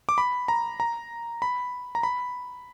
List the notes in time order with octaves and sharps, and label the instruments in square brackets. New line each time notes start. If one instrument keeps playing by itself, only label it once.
[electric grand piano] D6
B5
A#5
A#5
B5
A#5
B5